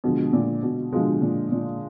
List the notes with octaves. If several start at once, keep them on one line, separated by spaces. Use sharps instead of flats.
B2 D3 F3 G#3
A#2
B2
B2 D3 F3 G#3
A#2
A#2